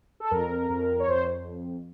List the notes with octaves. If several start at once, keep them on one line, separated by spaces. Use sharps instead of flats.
A4
F2 A#4
F2
C#5
F2 C5